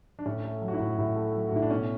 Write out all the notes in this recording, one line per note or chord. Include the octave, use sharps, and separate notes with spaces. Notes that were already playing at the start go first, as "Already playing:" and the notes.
D4
A2 C#4
A3
F#3
F#4
E4
A2
A2
A3
F#3
F#4
A2 E4
D4
B2 C#4